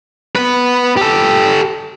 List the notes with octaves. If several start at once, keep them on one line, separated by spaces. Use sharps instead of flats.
B3 B4
G4 A4